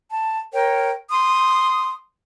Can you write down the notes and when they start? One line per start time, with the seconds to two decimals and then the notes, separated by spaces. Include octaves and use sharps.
0.08 A5
0.53 A#4 C#5 G5
1.10 C6 D#6